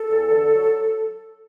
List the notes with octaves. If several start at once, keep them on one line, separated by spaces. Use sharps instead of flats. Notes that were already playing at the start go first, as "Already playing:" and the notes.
Already playing: A4
E2
D3
F#3